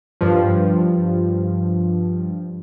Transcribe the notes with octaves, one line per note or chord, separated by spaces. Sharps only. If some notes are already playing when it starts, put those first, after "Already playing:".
G2 F3